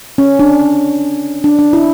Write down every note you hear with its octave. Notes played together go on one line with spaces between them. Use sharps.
C#4
D4
D4
D4
E4